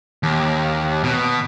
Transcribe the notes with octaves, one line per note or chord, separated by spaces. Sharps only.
D#2
B2